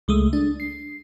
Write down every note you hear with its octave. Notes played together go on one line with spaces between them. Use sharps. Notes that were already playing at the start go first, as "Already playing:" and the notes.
C#2 G#3 A3 D#6
D4
C7